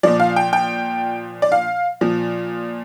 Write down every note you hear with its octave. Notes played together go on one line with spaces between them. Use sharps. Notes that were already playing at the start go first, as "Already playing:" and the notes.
A#2 F3 D5
F5
G5
G5
D5
F5
A#2 F3